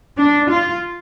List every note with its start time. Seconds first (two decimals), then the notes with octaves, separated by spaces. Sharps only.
0.18 D4
0.51 F4